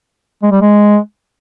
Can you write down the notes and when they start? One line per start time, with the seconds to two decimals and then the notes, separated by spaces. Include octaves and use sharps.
0.43 G#3
0.51 G3
0.61 G#3